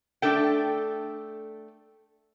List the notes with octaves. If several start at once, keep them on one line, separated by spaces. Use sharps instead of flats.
A3 D4 A4 G5